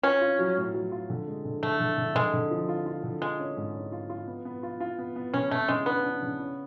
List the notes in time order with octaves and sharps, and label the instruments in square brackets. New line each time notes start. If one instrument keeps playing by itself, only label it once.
[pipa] C#4 [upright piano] F4
[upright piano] F4
F#3
A2
F#3
F4
D3
G#3
D3
[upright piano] D3 [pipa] A3
[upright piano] D3
D3
[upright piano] D3 [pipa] G#3
[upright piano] D3
F3
F4
F4
D3
[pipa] G#3 [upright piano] F4
[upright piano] C#4
G#2
C#4
F4
F4
B3
B3
F4
F4
B3
B3
[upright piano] C#3 [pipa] C#4
[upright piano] C#3 [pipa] A3
[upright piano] C#3 [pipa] G#3
[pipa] B3 [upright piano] D4
[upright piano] D4
C#3
C#4